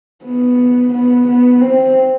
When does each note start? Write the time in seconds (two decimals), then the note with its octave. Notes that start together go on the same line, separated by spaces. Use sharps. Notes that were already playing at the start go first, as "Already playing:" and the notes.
0.25 B3
0.94 B3
1.28 B3
1.61 C4